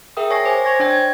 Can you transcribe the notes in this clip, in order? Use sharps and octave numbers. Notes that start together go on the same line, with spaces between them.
G#4 A#4 E5 G5 D#6
C#5 G#5 C#6 A#6 C7
C5 G#5 D6
C5 C#6 G#6 A#6
D4 C#5 G5
G#6